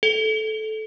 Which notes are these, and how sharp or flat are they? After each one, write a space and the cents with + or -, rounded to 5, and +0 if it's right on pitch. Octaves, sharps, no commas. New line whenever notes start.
A4 -15